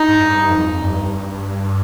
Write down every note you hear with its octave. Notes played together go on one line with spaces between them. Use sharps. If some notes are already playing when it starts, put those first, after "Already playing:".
Already playing: D#4
G#2
G2
F2
G2